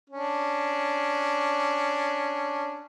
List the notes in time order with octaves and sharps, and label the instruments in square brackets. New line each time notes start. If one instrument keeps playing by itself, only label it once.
[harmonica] C#4 D4